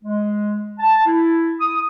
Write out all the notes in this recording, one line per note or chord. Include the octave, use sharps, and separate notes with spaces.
G#3
A5
E4
D#6